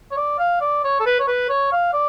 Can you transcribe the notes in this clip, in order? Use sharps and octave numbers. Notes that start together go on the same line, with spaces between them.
C#5
D5
F5
D5
C#5
A4
B4
C#5
B4
C#5
F5
D5